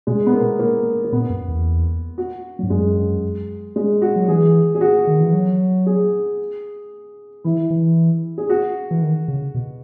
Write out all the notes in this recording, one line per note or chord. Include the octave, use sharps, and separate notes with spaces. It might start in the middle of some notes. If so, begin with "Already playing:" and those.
B2 G#3
B3
A#3
A#3
A#3
A#2 B3
F#2
E2
F#4
G#2 F#3
F#2 G#3
G#3
F#4
F#3
E3 G#4
G#4
F#4
D#3
E3
F#3
G#4
E3 E4
E3
G#4
F#4
E3
D#3
C#3
B2